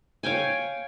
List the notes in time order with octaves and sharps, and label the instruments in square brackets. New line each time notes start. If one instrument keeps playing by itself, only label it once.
[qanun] C#5 F5 G5 G#5